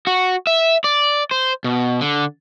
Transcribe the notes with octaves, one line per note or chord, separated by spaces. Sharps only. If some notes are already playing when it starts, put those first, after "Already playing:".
F#4
E5
D5
C5
B2
D3